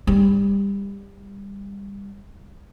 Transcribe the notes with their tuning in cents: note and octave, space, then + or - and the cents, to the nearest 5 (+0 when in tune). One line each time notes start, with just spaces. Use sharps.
G3 +25